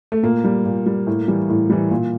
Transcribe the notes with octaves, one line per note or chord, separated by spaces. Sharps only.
A3
A#2 A#3
G3
A#2
G3
A2
E3 G3
A2
E3 G3
A#2